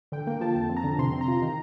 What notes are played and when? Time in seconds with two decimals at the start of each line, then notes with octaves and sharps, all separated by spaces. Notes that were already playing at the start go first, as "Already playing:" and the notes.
0.12 D3 G5
0.27 A#3 G5
0.41 F3 A5
0.55 F2 A5
0.69 C4
0.77 A#5
0.84 D3
0.99 C3 C6
1.13 C4
1.21 A#5
1.28 F4
1.42 D#3